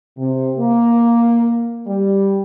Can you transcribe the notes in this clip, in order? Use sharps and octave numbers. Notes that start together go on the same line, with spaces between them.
C3
A#3
G3